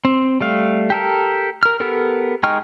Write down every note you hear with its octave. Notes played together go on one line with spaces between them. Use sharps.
C4
G3 A3 F5
G4 A4 A#4
A#4 F6
B3 G4 A4 A#4
G#3 D#4 G5 C#6 F6